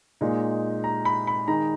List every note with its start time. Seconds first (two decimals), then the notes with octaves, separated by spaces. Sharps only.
0.21 A#2 G#3 D#4
0.84 A#5
1.05 B5
1.27 B5
1.47 D#3 G#3 D#4 A#5